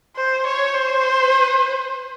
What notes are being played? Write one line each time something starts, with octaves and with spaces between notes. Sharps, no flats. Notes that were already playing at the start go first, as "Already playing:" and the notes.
C5
C#5
C5